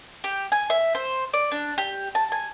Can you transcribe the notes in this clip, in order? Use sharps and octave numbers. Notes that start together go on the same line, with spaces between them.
G4
G#5
E5
C5
D5
D4
G4
A5
G#5